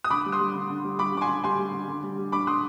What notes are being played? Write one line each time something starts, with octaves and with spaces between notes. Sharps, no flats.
D#6
D3 B5 D6
G3
C6 D#6
G3
D3
D3
G3
G3 B5 D6
D3 D6
G#5 C6
D3
G3 G#5 C6
G3
D3
D3
G3
G3
D3 B5 D6
D3 C6 D#6